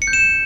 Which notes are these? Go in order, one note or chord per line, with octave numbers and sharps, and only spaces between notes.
C#7
G6
E7